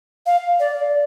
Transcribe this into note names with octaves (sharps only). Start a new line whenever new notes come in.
F5
D5